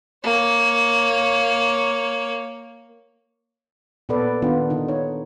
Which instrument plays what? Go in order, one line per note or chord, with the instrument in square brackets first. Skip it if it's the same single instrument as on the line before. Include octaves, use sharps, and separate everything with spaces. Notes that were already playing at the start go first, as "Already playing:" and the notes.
[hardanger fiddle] A#3 C#5
[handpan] A#2 B3 A4 B4 D5
D#3 B3 D4 F4
D3 D#4
D#4 C#5